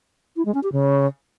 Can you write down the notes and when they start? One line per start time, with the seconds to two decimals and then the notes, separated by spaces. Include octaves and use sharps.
0.36 E4
0.45 G#3
0.54 C#4
0.63 G4
0.72 C#3